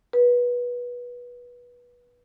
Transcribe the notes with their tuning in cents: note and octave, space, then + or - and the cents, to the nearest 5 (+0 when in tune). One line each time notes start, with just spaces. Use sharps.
B4 -20